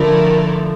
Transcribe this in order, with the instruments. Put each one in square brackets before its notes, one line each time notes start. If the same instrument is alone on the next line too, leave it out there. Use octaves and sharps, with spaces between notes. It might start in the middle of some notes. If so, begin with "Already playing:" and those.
Already playing: [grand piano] D3 F3 [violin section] A3 E4 A#4 D5